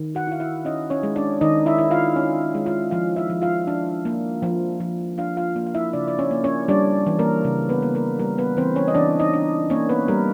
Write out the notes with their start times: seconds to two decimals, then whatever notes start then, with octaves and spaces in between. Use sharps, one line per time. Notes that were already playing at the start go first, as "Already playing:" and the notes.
Already playing: D#3
0.15 F#4 F#5
0.27 E4 F5
0.40 E4 E5
0.65 C#4 D#4 D#5
0.90 C#4 C#5
1.03 G#3
1.16 D4 D5
1.41 D#3 D#4 D#5
1.66 E4 E5
1.78 E4
1.91 F4 F5
2.16 C#4
2.55 G#3
2.66 F4 F5
2.91 F3 F4 F5
3.16 E4 E5
3.30 F3
3.42 F4 F5
3.67 D4
4.05 A#3
4.43 F3
4.80 F3
5.18 D4 F4 F5
5.37 F4 F5
5.56 A#3
5.67 F5
5.75 E4 E5
5.93 C#3 D4 D5
6.08 D5
6.19 C#4 C#5
6.31 A#3
6.44 C#4 C#5
6.68 G3 D4 D5
7.07 E3
7.19 A#3 A#4
7.45 C#3
7.69 B3 B4
7.82 A#3
7.95 A#3 A#4
8.19 G3 A#3 A#4
8.38 B3 B4
8.57 E3 C4 C5
8.76 C#4 C#5
8.88 D#5
8.94 E3 D4 D5
9.20 D#4 D#5
9.33 D4
9.70 A#3 C#4 C#5
9.89 B3 B4
10.08 G3 A#3 A#4